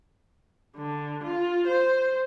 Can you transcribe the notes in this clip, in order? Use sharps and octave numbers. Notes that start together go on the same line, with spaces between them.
D3
F4
C5